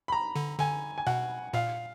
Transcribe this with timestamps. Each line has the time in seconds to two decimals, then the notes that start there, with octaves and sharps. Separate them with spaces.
0.08 B5
0.12 A#5
0.36 D3
0.59 D3 G#5
0.98 G#5
1.07 B2 F#5
1.53 A#2 F5